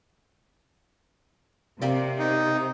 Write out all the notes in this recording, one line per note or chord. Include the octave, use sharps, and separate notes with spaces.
C3 A#3 G4 D5
D#4